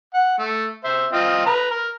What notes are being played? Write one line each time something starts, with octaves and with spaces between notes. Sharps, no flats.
F#5
A3
C5 E5
C4 F4 D#5
B4 A#5
A#4